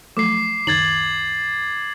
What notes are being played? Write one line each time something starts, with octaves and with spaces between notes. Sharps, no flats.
F3 F#3 A3 D6 C7
C#2 F#2 D#3 G#6 A6 F#7